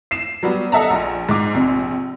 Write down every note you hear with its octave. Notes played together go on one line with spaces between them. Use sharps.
C7 E7
F#3 G3 B3
A4 D#5 E5 F#5 A5 A#5
A#1
G#2 D6
A#1 C3